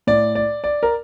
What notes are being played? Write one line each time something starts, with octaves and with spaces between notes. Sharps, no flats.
A2 D5
D5
D5
A#4